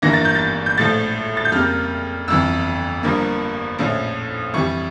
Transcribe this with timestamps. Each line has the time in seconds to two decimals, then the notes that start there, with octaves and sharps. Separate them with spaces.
0.02 G1 G2 E3 A#3 A#6
0.13 A6
0.25 G6
0.35 A6
0.66 G6
0.78 A#1 A2 F3 A3 A6
1.37 A6
1.45 G6
1.52 F2 C#3 G3 A#3 F6
2.28 G1 F2 E3 E6
3.03 G1 G2 F3 A#3
3.79 A#1 A2 F3 C#4 E4
4.54 F2 E3 G3 C#6